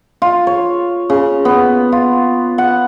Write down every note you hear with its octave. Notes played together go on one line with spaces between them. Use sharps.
F4
C#5
C#3
B3
F4
F#5